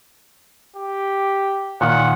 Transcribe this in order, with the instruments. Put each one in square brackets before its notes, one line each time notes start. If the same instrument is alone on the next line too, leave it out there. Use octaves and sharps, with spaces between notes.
[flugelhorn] G4
[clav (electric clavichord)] A#2 D#3 [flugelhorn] F#5